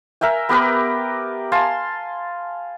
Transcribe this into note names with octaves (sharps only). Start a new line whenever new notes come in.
A#4 E5 G5 G#5
B3 G4 A#4 B4
F5 G#5 A5 C6